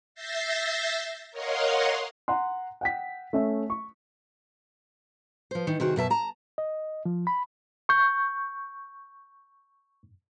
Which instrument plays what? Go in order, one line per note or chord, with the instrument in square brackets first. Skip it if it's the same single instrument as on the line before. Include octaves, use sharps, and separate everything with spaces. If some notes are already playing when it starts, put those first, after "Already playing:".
[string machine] E5 G6 A6 A#6 C7
A#4 C#5 D#5 F5 F#5 C6
[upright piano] F#5 A#5 C6
F#5 G5 B6
A3 C#4 E5
C#6
[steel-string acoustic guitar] F3 C5
D#3 E3 D#4
C3 D#3 F#4 G#4
F#2 B2 E5 A5
A5 A#5
[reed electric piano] D#5
F3
B5
C#6 G6